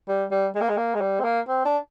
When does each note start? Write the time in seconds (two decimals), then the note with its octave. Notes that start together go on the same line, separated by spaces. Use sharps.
0.08 G3
0.31 G3
0.55 G#3
0.61 A#3
0.69 G#3
0.77 A#3
0.95 G#3
1.01 G3
1.20 C4
1.24 A#3
1.48 C4
1.65 D4